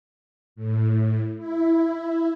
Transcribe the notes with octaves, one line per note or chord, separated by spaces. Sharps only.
A2
E4